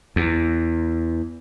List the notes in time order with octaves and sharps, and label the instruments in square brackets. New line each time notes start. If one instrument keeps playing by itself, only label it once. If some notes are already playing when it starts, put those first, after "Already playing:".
[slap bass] E2